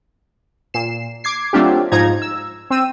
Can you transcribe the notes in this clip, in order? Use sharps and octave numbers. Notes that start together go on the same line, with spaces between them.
A#2 C7 E7
D6 G#6 C7
F#3 A3 C4 D4 F4 G4
G#2 F3 D#4 A#5 G#6
E6
C4 E6 D#7